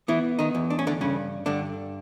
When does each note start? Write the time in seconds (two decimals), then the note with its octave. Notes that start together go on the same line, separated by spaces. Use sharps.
0.08 E3 B3 E4
0.39 D#3 D#4
0.55 E2
0.70 D4
0.79 C#4
0.87 D3 D4
1.01 G2 C#3 C#4
1.46 G2 D3 D4